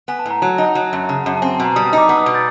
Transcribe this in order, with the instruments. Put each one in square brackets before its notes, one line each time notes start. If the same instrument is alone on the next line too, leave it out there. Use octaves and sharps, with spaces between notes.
[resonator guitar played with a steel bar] B3 [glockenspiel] G#5
[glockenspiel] A5
[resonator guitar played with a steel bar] A2
[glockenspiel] A#5
[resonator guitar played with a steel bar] F#3 [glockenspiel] A5
[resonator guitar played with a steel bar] D#4 [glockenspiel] A5
[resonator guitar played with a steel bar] F#3 [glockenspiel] A5
[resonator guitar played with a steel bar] F#2
[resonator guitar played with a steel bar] C#3 [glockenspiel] A5
[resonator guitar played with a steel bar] F#2
[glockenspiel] A5
[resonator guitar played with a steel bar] C4 [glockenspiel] G#5
[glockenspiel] A5
[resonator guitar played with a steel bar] B2
[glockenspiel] A#5
[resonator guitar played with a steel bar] G3 [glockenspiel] D#6
[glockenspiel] D#6
[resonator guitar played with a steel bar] D#4
[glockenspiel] D6
[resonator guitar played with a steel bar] B3 [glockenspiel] D#6
[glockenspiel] E6
[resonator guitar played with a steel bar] B2
[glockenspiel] G6 A6